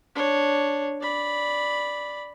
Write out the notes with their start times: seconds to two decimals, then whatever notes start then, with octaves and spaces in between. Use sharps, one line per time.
0.16 D4 C#5
1.02 D5 B5